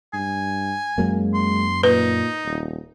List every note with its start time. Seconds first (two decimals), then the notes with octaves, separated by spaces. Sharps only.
0.14 G2 G#5
0.98 F#2 F#3 G#3 A#3
1.34 C6
1.83 A#2 D#4 B4
2.45 D#1